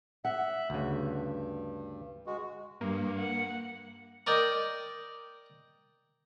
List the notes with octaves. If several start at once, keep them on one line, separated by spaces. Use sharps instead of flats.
E5 F#5
D2 G2 C#3
G#3 F#4
G2 A#3
F#5
A#4 D5 D#5 G5